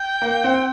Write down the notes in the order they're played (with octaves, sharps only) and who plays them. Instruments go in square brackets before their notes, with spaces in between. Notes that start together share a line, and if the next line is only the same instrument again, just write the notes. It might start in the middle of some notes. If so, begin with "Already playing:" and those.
Already playing: [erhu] G5
[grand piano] A#3
C4